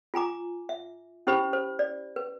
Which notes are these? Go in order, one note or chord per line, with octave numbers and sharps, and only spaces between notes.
F4 G#5 A#5 D6
E5
C#4 E4 G4 C5 B5
C5
D5
B4